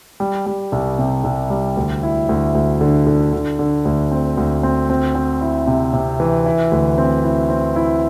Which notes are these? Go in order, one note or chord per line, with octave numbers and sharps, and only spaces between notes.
G3
G3
C2
C3
C2
G3
D2
E4
D2
D2
D3
D3
D3
D3
D2
C4
D2
C4
C4
C4
E4
C3
C3
E3
E4
D2
C4
E4
C4
E4